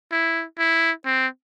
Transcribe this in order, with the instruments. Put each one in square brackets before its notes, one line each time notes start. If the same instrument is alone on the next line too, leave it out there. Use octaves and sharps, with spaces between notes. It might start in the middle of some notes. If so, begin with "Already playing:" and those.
[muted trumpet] E4
E4
C4